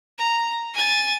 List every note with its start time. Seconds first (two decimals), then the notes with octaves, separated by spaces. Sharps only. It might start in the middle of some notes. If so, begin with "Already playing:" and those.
0.18 A#5
0.74 G#5 A6